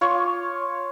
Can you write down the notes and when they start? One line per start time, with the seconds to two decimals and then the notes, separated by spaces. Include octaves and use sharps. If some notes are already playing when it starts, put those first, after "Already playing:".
0.01 F4 C#5 C#6 D6